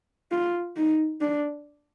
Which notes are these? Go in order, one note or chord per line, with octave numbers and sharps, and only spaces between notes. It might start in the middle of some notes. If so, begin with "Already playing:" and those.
F4
D#4
D4